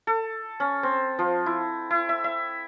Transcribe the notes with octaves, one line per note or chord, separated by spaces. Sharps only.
A4
C#4
C4
F3
E4
E4
E5
E5